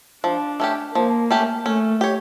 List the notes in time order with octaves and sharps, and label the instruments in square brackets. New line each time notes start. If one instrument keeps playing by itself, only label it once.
[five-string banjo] F3 [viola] D4
[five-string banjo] A3 C#4 G4
[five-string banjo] F3 [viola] A#3
[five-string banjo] A3 C#4 G4
[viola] A3 [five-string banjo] C#4
[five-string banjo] G4 C#5